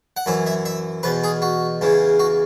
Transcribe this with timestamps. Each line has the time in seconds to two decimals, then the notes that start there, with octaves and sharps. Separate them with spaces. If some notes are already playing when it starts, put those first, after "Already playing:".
0.17 F#5
0.26 F#2 E3 E5
0.46 E5
0.65 E5
1.03 E2 B2 B4
1.24 G#4
1.42 F#4
1.81 E2 C#3 E3
2.19 F#4